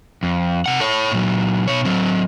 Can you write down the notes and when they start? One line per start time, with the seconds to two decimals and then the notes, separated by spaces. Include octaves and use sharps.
0.23 F2
0.66 C3 F#5
0.80 A4 C#5
1.12 A#2 F#3
1.68 B2 C#5
1.85 F#3 C4